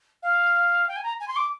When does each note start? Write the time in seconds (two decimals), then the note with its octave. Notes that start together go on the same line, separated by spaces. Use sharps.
0.23 F5
0.88 G5
0.96 G#5
1.03 A#5
1.20 G#5
1.28 C6
1.36 D6